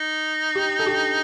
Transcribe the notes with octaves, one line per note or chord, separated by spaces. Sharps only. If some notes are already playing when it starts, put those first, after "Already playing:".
Already playing: D#4
G4
A4
G4